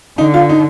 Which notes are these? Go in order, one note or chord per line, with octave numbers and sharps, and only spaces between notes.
D3 D#4
F4
D#4